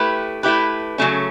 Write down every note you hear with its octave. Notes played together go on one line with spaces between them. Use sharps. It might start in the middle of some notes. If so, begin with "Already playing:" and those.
Already playing: A3 E4 G4 B4
A3 E4 G4 B4
C#3 F#3 A3 C#4